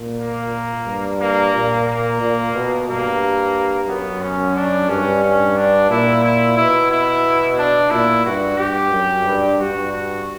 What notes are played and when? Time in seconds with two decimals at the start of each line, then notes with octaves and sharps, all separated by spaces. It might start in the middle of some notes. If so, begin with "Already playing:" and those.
Already playing: A#2
0.20 A#3
0.87 G2
1.21 A#3
1.54 A#2
1.87 A#3
2.21 A#2
2.55 B2
2.88 G2 A#3
3.88 F#2 B3
4.22 C#4
4.56 D4
4.89 G2 C#4
5.23 C#4
5.57 D4
5.90 A#2 E4
6.24 E4
6.57 B2 E4
6.91 E4
7.58 D4
7.91 A#2 E4
8.25 G2 F#4
8.58 G2 G4
8.92 F#2
9.25 G2
9.59 G2 F#4
9.92 F#4